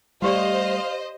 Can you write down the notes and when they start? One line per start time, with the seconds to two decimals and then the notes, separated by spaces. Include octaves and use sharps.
0.22 G3 A3 F#4 G4 C5 D5 D#5 F5